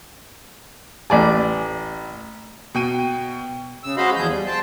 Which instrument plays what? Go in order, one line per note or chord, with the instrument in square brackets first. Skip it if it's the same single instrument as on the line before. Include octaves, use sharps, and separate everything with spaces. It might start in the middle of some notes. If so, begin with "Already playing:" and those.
[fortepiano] A1 D5 G#5
[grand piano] B2 G5 D#7
[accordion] C#3 E6
G#3 F#4 C5 D#5 F5 B5
E2 F3 G#4 G6
G3
C5 G5 A5